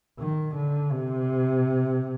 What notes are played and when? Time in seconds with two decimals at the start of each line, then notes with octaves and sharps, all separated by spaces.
0.20 D#3
0.55 D3
0.92 C3